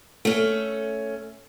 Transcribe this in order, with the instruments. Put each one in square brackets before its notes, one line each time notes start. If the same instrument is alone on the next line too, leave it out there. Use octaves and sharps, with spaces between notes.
[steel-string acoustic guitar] A3 C#4